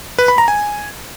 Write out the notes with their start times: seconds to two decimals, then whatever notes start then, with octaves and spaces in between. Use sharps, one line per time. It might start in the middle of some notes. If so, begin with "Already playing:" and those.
0.18 B4
0.28 B5
0.38 A#5
0.48 G#5